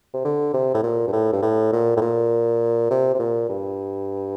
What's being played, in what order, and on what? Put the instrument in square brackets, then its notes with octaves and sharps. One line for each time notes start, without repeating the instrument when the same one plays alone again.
[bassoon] C3
D3
C3
A2
A#2
G2
A2
G2
A2
A#2
A2
A#2
C3
C3
A#2
G2